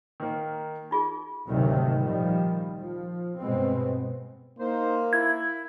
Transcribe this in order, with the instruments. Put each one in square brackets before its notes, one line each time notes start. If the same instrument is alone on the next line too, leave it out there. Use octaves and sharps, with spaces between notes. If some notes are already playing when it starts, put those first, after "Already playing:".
[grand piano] D#3 A#3
[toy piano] D#4 F4 G#4
[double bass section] D2 G#2 C3 D#3 F#3 A3
A#2 D#3 F3 G3
F3
G2 B2 G#3 B3 C4
[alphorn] A#3 [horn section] D#4 C5
[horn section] E4 [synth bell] G#6